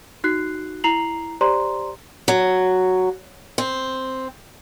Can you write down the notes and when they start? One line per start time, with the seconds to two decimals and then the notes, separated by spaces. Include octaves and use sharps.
0.24 D#4 F#4 F#6 C7
0.84 E4 A#5 C7 F7 F#7
1.41 G4 C5 D5 A#5 C6
2.28 F#3
3.58 C4